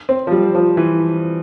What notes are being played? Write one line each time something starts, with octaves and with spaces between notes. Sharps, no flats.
C4
F3
G3
F3
E3